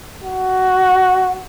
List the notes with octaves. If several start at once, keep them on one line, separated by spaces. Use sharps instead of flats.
F#4